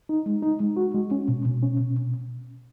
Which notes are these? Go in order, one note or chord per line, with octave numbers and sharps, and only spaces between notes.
D#4
G#3
D#4
G#3
F#4
G#3
C#4
B2
B2
C#4
B2